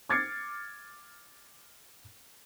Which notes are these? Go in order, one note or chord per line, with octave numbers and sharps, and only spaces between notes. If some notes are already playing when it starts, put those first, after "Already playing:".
D6 F6 G#6 A6 C7 C#7